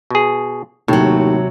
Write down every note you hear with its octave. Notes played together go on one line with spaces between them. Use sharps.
B2 G#4
D#2 A2 C3 F#3